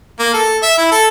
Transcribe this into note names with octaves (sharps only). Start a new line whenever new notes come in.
A#3
A4
E5
E4
A4